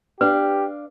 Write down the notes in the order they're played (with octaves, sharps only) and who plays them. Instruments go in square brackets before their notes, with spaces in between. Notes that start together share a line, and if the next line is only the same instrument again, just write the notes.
[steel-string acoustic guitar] D4 F5 [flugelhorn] G4 [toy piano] B4